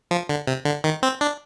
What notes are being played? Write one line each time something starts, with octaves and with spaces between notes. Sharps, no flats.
F3
D3
C3
D3
D#3
C4
D4